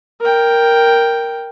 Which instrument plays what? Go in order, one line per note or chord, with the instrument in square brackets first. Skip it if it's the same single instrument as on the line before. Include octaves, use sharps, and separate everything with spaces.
[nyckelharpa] A#4 G5